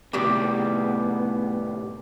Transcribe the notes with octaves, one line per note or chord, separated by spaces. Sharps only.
A2 C3 D#3 G3 G#3 B3 D6